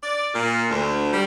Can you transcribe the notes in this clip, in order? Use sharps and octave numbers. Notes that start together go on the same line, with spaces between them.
D5
A#2
D2
G3